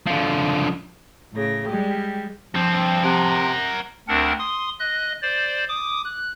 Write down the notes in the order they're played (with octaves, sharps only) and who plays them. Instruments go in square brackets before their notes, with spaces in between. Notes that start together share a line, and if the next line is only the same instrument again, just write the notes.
[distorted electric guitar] D3 F3
[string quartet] A2 C#3 A#6
G3 G#3 G4
[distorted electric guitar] G2 C4 [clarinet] F3
[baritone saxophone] C3 [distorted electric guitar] A#4 F#5
[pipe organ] D2 C4 D4 A#4 F#5
C6 D#6
D#5 F#6
C5 D5
D6 D#6
F#6